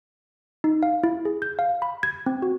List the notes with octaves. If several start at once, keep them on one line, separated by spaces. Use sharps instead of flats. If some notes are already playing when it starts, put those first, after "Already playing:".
D#4
F5
E4
G#4
G6
F5
B5
G#6
C4
F#4